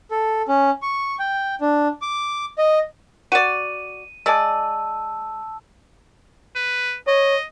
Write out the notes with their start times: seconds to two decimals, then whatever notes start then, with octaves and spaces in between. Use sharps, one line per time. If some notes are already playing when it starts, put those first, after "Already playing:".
0.11 A4
0.48 C#4
0.82 C#6
1.19 G5
1.61 D4
2.02 D6
2.58 D#5
3.32 F#4 D5 D#7
4.26 G#3 D5 A5 E6
6.56 B4
7.07 C#5 D#5